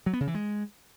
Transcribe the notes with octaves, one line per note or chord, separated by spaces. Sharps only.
F#3
B3
C#3
E3
G#3